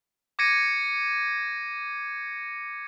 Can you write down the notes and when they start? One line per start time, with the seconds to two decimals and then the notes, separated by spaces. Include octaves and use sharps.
0.39 D6 G#6 A#6 C#7 D#7